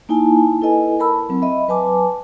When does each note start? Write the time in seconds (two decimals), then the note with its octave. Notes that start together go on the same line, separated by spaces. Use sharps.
0.09 A#3 D#4 E4 G#5 A5
0.62 E4 A4 B4 D#5 G#5
0.99 A#4 A5 B5 E6
1.29 F#3 C4
1.42 D#5 E5 B5
1.68 F#3 B4 G#5 A5 D6